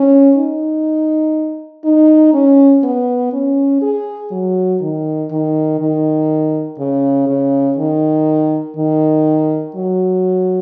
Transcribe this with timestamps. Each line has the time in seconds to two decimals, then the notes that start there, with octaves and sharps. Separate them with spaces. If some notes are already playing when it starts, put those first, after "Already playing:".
Already playing: C#4
0.37 D#4
1.85 D#4
2.34 C#4
2.84 B3
3.33 C#4
3.82 G#4
4.31 F#3
4.81 D#3
5.31 D#3
5.80 D#3
6.79 C#3
7.28 C#3
7.78 D#3
8.77 D#3
9.76 F#3